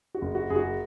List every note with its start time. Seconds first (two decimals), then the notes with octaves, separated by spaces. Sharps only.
0.14 F#4
0.22 F#1
0.35 F#4
0.50 F#1 G#4
0.56 F#4